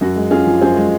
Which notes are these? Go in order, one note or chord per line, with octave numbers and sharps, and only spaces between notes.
F#2 F#4
G#3
C#4 F4 G#4
F3
F#2 G#4 C5
G#3